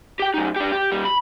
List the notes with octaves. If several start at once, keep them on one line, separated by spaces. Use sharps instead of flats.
G4 G5
F#2 D#4
D4 G4
G4
A#2 G3
B5